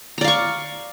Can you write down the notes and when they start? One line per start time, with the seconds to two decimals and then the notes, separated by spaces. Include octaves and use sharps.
0.18 A#5
0.21 D5
0.24 F5
0.28 C#6